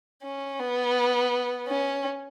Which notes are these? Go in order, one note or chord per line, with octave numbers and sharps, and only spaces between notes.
C#4
B3
C#4